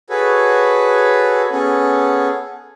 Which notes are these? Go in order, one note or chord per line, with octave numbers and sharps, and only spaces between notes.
F#4 G#4 A4 B4 C#5
B3 C#4 G#4 A4